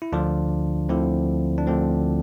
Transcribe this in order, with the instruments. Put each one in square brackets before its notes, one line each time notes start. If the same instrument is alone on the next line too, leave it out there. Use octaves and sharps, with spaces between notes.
[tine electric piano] E4
D2 D3 F3 D4 F4
D2 D3 F3 C4 E4
D4
D2 D3 F3 C4